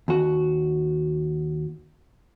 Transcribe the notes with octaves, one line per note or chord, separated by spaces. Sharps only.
D#2 F#4